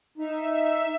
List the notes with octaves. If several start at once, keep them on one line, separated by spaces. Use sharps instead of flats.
D#4 E5